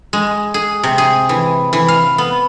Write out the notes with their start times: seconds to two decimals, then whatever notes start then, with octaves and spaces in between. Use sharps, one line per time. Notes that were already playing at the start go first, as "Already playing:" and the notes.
0.13 G#3
0.54 G#4
0.83 C3
0.98 G#4
1.29 E3
1.73 E3
1.88 F5
2.18 B3